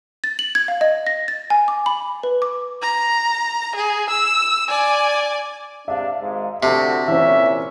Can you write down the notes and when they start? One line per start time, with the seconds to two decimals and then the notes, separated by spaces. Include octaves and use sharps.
0.24 A6
0.39 F#7
0.55 G#6
0.68 F5
0.81 D#5
1.07 A#6
1.28 A6
1.50 G#5
1.68 D6
1.86 B5
2.23 B4
2.42 D6
2.82 A#5
3.76 G#4
4.10 E6
4.68 D5 G#5
5.88 C3 G#3 D4 E5 F5
6.19 G#1 G#2 G#3
6.63 D2 C3 A3 F#4 A5
7.08 A#2 E3 C4 C#4 G4 E5